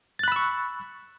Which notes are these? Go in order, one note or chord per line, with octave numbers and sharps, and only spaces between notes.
B5 C#6 E6 F#6 A6